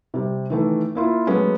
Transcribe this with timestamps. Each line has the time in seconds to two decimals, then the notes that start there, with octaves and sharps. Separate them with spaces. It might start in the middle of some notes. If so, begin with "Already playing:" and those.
0.14 C3 G3
0.50 D#3 E3 A3
0.95 A#3 E4 F4
1.27 F#3 G#3 A3 B3 C#4